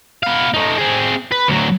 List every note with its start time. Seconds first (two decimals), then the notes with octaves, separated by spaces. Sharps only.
0.23 B3 F5
0.54 A3 D#4
0.78 C4 G#4
1.32 B4
1.48 D2 F#3